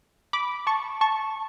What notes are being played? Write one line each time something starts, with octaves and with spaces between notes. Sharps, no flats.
B5 D6
A5 C#6
A5 C#6